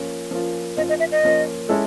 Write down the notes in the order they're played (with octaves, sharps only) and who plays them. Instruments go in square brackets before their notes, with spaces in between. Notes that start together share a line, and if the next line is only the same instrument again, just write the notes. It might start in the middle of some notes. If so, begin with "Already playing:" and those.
Already playing: [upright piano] F3 A#3 C#4 F4
F3 A#3 C#4 F4
[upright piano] F3 A#3 C#4 F4 [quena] D#5
[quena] D#5
E5
D#5
[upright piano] F3 A#3 C#4 F4
G#3 C#4 E4 A4